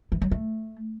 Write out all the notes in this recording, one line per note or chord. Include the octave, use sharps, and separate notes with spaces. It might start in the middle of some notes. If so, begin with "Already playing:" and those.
E3
F#3
A3